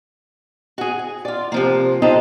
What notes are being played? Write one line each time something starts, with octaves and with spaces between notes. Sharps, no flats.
F#4 G#4
G#5
F4 D5
C3 F3 A#3
E3 C4 D4 D#4 F4 A4